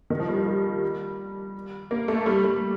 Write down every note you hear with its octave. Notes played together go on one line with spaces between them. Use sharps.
D#3
F3
G3
F3
G3
A#3
A3
G3
G3